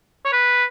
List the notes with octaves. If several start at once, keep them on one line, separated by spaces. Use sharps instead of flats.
C#5
B4